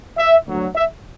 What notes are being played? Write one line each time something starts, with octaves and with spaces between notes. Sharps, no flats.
E5
D2 D3 F#3
E5